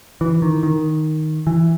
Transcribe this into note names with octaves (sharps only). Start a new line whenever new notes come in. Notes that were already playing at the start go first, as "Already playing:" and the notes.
E3
D#3
D#3
E3